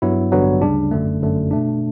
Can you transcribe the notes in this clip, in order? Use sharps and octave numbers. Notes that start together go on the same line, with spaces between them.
G2 F#3 B3 E4
A1 G2 D3 F#3 B3
D2 C#3 G3 D4
G1 F#2 D3 A3
G1 F#2 D3 A3
B2 A3 D4